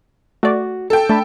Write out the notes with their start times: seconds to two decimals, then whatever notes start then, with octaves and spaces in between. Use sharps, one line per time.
0.43 A3 F#4 D5
0.90 A4 G5
1.10 A3 D4 A5 B5